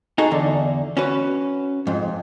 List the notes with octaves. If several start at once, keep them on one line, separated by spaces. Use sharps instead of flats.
D#4 F#4 G#4 A4
E2 D3
C#4 F#4 B4
F2 G#2